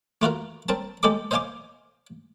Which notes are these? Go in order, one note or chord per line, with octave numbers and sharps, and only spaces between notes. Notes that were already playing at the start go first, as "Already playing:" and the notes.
A3 F4 F#4 A#4
C4 A#4 A5
G#3 G4 A4 D#5 D6
C5 D#5 F5 G#5 C6 D6